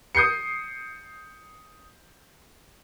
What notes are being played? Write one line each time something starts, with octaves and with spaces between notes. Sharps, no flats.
D#6 G6 C7 C#7